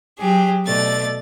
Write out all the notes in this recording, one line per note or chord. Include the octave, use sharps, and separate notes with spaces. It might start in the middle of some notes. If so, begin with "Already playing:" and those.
F#3 G4 G#4
B2 A3 D5 A6